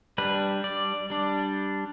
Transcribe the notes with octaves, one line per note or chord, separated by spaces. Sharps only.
G3 D4 B4
D5
G3 D4